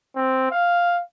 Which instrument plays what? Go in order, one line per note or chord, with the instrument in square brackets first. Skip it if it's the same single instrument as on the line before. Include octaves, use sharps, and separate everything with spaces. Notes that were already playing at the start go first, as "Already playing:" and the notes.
[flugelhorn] C4
F5